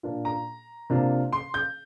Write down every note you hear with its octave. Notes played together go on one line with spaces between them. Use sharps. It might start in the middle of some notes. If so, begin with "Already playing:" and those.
A#2 A#3 D4 F4
A#5
C3 A#3 D4 F4
C6
G6